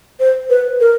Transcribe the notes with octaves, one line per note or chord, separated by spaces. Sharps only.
C5
B4
A#4